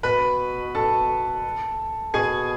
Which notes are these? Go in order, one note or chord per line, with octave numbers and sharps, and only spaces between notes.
B2 B4 B5
A4 A5
B2 G#4 G#5